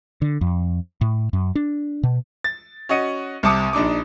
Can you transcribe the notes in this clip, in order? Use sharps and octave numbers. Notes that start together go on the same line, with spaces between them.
D3
F2
A2
F#2
D4
B2
A6
C#4 F#4 D#5 C#7 D#7
C2 C3 A5 D6 D#6 C#7
A#1 D4 D#4 D6